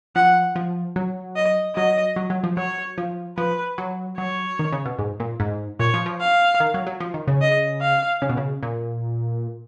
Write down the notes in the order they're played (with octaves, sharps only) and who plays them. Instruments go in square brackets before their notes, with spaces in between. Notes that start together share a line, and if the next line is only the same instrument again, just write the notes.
[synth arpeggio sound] F3 [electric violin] F#5
[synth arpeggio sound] F3
F#3
[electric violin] D#5
[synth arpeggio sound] F#3 [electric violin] D#5
[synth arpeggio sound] F#3
F#3
F3
[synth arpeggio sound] F#3 [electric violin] C#5
[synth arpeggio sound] F3
[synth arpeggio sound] F3 [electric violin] B4
[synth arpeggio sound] F#3
[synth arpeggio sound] F#3 [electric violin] C#5
[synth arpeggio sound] D#3
C#3
B2
G#2
A#2
G#2
[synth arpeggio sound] A#2 [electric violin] C#5
[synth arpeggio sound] F3
F3
[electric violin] F5
[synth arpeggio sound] D#3
F#3
F#3
F3
D#3
C#3
[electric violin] D#5
F5
[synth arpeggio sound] C#3
B2
C#3
A#2